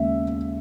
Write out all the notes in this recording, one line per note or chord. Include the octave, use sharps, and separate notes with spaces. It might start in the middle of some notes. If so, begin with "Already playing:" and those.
Already playing: D#2 C#3 G#3 E5